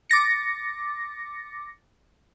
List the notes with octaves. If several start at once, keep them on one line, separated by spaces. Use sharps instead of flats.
D6 A6 A#6 C#7